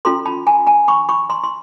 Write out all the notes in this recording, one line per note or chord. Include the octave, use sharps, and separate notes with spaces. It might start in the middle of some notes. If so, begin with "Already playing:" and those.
C#4 F4 A4 A#5 C6
A5 B5
G#5 A#5
G#5 A#5
B5 C#6
B5 C#6
A#5 C6
C6